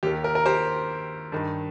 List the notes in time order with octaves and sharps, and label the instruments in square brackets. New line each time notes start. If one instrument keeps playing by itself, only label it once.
[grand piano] D#2 D#3 G4
A#4
A#4
G4 C5
G2 D#3